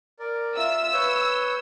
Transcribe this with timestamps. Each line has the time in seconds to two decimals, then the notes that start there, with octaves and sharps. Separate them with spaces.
0.19 A#4 D5
0.57 F4 E5 E6
0.93 B4 C#5 G6